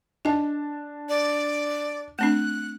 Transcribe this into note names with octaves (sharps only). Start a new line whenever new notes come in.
D4 D#5 G#5 A5
D5
A3 C4 D4 F#6